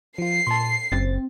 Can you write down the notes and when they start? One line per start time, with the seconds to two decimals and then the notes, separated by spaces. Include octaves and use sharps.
0.18 F3 F4 C7
0.47 A#2 A5 C6
0.92 F#1 C4 A6